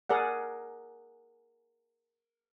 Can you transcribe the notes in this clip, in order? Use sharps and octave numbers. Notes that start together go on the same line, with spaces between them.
G#4 A#4 D5 F#5